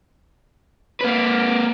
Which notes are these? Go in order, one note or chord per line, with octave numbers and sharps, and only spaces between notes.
A#3 B4